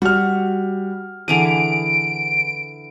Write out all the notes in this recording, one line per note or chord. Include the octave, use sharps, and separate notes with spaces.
G3 F#4 F6
D3 E3 G#4 D7 D#7 F7